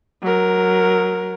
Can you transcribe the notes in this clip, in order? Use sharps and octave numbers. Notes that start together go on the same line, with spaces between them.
F#3 A#4